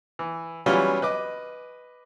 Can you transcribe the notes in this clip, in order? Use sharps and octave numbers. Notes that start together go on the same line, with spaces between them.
E3
E3 F#3 G3 B3 C#4 F4
B4 D#5 D6